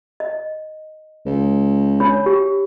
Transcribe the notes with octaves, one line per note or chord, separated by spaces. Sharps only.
D#5
C#2
D4 C#5 B5
G4